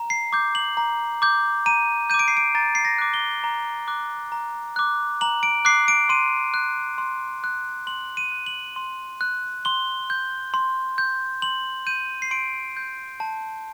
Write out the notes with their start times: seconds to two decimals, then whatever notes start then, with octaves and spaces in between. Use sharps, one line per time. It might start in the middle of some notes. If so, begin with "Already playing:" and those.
Already playing: A#5
0.10 C7
0.33 D6 G6
0.55 F#7
0.77 A#5
1.22 D6 G6
1.66 A#5 D#7
2.10 D6 G6 D#7
2.19 D7
2.28 C7
2.37 D7
2.55 A#5 A6
2.75 C7
2.85 A#6
2.98 D6 F#6
3.14 G7
3.44 A#5
3.88 D6 F#6
4.32 A#5
4.76 D6 F#6
5.21 A#5 F#7
5.43 D7
5.65 D6 F#6 C7
5.88 D7
6.09 C6 D#7
6.54 F#6
6.98 C6
7.44 F#6
7.87 C6 F#7
8.17 D#7
8.32 F#6
8.46 F#7
8.76 C6
9.21 F#6
9.65 C6 G7
10.10 G6
10.54 C6
10.98 G6
11.42 C6 F#7
11.87 G6 D#7
12.22 C7
12.31 C6 D7
12.77 G6
13.20 A5